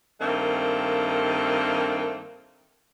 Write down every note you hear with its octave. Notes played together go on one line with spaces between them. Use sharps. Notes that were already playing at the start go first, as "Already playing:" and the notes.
G2 D#3 A3 A#3 C4